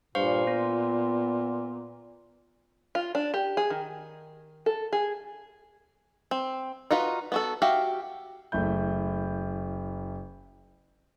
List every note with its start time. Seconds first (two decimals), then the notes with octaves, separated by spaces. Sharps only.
0.15 G2 A#2 C5 F5 C#6
0.47 B3 F4
2.95 F4
3.15 D4
3.34 G4
3.57 G#4
3.70 D#3
4.66 A4
4.93 G#4
6.31 C4
6.91 D#4 F4 F#4 B4
7.32 B3 F#4 A4
7.62 F#4 G4 E5 F5
8.52 F#1 A3 E4 G6